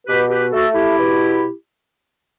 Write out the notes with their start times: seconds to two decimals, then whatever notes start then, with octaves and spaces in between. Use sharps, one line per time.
0.07 B2 G4 B4
0.30 G4 B4
0.52 A3 F#4 A4
0.74 E4 G4
0.97 B2